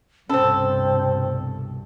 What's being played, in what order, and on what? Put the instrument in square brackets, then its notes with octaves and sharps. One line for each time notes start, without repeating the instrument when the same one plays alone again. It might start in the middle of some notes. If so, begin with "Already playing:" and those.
[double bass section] C2 G2 B2 [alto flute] C4 [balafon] C#4 C5 [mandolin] A4